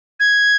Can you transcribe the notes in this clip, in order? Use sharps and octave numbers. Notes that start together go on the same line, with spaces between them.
G#6